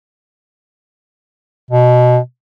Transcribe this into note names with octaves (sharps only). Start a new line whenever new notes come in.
B2